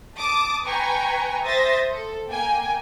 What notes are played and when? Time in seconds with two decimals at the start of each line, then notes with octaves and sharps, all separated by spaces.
0.16 A5 D6 D#6
0.65 B4 G5 G#5 A#5 C#6
1.44 C5 E5 D#6 A6 A#6
1.91 A4
2.28 A#3 G5 G#5